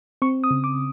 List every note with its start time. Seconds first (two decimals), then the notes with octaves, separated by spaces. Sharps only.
0.22 C4 C#6
0.44 D#6
0.51 C#3
0.64 D6